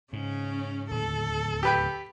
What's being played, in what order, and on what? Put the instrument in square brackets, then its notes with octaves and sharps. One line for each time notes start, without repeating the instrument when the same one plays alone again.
[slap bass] G#2 [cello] C#3 C#4
[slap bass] D1 D#2 [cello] A4
[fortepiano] G4 B4 G5